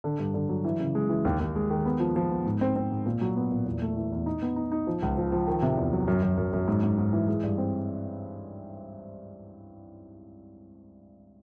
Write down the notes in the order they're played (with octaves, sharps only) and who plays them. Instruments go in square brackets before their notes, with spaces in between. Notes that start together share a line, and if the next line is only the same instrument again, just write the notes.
[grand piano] D3
G2
D3
F#3
E3
C#3
G#3
E3
D#2
D#2
G#3
D#3
B3
F3
F3
B3
G#2
C4
C4
G#2
A#2
F#3
B3
A#2
E2
A3
E3
E2
D#4
B3
D#4
D#4
F3
C#2
F3
F3
D#3
C3
E2
F#3
F#2
F#2
F#2
F#2
G#2
G#2
G#2
E3
G#3
G2
C4